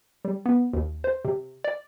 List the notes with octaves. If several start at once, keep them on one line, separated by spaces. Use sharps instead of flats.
G3
B3
D#2
C5
C3
D5